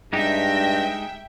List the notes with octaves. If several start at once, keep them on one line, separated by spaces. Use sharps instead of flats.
G2 G#3 D#4 G4 E5 G5 A#6